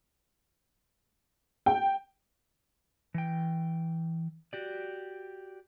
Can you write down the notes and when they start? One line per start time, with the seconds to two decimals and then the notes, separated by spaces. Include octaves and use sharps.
1.66 G5
3.14 E3 G5
4.53 F#4 G4 D5